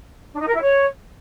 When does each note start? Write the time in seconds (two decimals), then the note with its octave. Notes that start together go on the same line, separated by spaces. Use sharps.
0.33 D4
0.40 D#4
0.47 A#4
0.54 E4
0.61 C#5